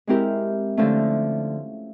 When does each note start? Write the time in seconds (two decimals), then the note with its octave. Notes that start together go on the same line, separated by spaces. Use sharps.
0.07 G#3 C4 E4 G4 A#4
0.77 D3 F3 A3 C#4